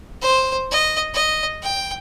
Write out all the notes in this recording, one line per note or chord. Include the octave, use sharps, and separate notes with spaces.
C5
D#5
D#5
G5